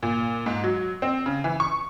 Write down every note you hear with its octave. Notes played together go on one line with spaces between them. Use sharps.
A#2
G#2
F#3
C4
C#3
E3
C#6